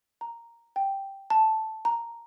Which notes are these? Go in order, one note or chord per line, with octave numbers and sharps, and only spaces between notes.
A#5
G5
A5
A#5